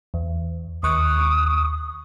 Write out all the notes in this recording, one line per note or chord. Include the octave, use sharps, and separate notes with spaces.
E2
D#2 C#6 D#6 F#6